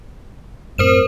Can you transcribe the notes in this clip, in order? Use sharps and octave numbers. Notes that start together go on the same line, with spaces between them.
F#2 A2 C4 A#4 C5 E7